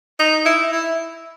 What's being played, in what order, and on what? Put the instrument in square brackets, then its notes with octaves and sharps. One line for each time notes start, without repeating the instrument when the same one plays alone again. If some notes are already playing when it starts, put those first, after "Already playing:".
[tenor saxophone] D#4
E4
E4